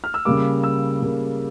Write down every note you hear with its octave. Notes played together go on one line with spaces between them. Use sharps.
F6
E6
C#3 G3 A#3 D6
E6
C#3 G3 A#3